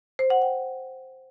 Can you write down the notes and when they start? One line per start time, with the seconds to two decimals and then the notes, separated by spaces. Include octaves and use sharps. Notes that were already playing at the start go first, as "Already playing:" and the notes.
0.19 C5
0.30 F#5
0.42 G5